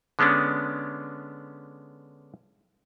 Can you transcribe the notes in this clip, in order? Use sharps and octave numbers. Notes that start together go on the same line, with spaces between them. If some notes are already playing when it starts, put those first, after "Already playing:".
D3 G#3 B3 C#4 D4